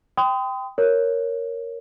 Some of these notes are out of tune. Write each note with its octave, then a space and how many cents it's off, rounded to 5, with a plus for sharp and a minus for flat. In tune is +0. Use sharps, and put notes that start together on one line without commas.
G5 +0 C6 -40 D#6 +15
A#4 +0 C#5 +0